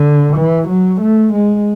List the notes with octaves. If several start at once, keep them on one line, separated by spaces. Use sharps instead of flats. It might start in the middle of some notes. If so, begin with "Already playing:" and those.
Already playing: D3
E3
F#3
A3
G#3